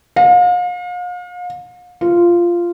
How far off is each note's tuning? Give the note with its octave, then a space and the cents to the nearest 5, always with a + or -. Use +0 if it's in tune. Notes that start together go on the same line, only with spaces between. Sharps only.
F5 +40
F4 -10